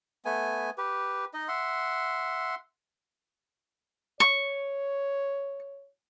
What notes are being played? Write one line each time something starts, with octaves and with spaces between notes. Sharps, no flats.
A3 B3 G#5
G4 B4
D#4 D#5
E5 F#5 C6
C#5 C#6